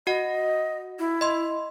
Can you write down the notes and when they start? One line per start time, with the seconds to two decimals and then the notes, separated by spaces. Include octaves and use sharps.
0.07 F#4 D#5 F#5
0.99 E4
1.21 D#5 C6